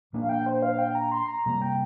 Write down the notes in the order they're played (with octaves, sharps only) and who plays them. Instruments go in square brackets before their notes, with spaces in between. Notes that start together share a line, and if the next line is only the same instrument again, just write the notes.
[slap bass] A#2 A#3 D4
[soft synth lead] F5
G5
C5
F5
G5
A#5
C6
A#5
[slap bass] C3 G3 A#3 [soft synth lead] A#5
[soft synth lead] G5